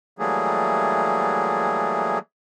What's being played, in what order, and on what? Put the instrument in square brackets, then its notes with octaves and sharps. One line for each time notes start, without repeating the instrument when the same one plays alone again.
[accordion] E3 F#3 G3 A3 A#3 G#4